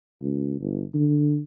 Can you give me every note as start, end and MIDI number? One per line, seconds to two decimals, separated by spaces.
0.22 0.57 37
0.60 0.84 31
0.94 1.40 50